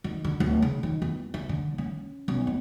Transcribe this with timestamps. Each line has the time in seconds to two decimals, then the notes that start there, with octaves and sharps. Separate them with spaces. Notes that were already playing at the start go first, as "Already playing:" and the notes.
0.04 D#3
0.25 D3
0.40 D1
0.62 C#3
0.83 D#3
1.02 E2
1.34 D3
1.49 D3
1.78 C#4
2.28 B1
2.47 C4